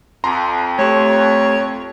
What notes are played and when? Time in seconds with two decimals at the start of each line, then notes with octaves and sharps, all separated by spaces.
0.24 F2 A#5 C6
0.79 A3 G4 C#5